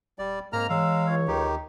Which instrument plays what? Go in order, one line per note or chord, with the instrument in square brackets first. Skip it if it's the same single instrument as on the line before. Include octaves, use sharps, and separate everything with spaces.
[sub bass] D#1 [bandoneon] G3 D5
[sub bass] G#2 [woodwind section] G#3 C4 A#4 [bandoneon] A#3 A#5 F6
[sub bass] E3 [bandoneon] G#3 F5 [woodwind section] C#5 A#5 E6
[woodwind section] C#2 C#5
[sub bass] D2 [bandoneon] D#3 D#4 G4